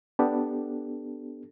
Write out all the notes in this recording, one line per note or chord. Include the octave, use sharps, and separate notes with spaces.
B3 D4 G4 A4